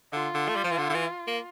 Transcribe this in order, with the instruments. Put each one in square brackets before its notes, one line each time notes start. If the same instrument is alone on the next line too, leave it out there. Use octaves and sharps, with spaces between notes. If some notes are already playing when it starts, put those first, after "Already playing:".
[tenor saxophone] D3 [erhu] F4
[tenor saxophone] D3
A3
G3
F3
E3
D3
D3
E3
A#3